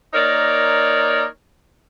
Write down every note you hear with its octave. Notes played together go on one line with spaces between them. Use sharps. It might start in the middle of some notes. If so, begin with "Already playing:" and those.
A#3 D#4 A#4 C#5 D5